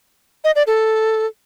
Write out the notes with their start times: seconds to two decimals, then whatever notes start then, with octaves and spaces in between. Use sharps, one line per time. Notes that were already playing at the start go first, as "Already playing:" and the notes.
0.44 D#5
0.56 D5
0.67 A4